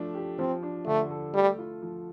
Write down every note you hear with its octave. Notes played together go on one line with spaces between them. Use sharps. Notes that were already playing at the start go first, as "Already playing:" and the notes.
Already playing: F3 A3 D4
G4
F3 C4
D4
D3 A3
A4
G3 A3
F4
F3